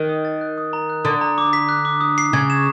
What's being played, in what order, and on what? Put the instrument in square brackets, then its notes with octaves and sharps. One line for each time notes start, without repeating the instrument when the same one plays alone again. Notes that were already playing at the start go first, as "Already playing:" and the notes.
Already playing: [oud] D#3 [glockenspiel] F#6
[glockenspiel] D#6
A6
F#6
D#6
A#5
F#6
[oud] D3 [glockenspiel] D#6
[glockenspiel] A#5
D6
B6
F#6
D6
D#6
C7
[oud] C#3 [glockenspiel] G#6
[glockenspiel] E7